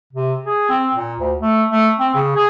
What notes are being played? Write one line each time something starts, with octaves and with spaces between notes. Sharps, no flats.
C3
G#4
C4
A#2
D2
A3
A3
C4
C#3
G#4